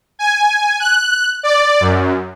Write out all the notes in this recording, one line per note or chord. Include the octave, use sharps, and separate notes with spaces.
G#5
F#6
D5
F#2